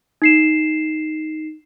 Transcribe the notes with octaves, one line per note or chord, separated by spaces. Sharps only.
D#4 C7 E7